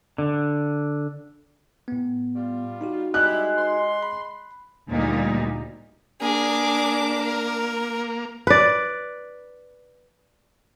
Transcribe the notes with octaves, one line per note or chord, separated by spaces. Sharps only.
D3
A2 B3
G3 F4
D#4 F#4 G4
G3 G#3 E4 F#6
C6
B5
D2 A#2 G3 D#4
A#3 D4 G#4 D6
A#4
B4 D5